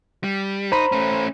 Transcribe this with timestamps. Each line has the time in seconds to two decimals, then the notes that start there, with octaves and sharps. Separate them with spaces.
0.23 G3
0.72 D#4 C5 A#5 B5
0.92 A3 C#4